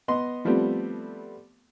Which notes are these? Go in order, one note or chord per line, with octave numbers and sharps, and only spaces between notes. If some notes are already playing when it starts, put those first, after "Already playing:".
B3 D#5 C6
F3 G3 A3 B3 C4